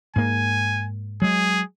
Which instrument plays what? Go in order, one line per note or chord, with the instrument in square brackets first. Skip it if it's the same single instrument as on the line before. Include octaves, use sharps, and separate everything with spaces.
[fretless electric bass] G#2 A#3 [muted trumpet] G#5
[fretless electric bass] F#3 G#3 [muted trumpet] G#4